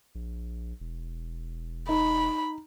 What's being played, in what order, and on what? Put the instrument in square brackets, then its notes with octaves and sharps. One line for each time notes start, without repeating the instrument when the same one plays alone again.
[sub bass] A#1
E1
[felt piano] D#4 [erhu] B5